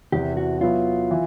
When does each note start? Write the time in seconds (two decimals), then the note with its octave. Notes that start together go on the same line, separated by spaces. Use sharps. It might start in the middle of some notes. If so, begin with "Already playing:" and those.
0.12 E2 C3 E3 G4
0.37 F#4
0.61 F#3 B3 E4 F4
1.11 E3